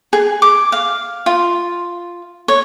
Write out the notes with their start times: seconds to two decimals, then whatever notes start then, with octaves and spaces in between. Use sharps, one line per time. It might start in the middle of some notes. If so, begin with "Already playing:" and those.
0.13 G#4
0.42 D6
0.72 F5
1.26 F4
2.48 C#5